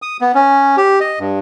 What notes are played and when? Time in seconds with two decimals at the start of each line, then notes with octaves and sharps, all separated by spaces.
0.02 D#6
0.21 B3
0.35 C#4
0.77 G4
1.01 D#5
1.19 G2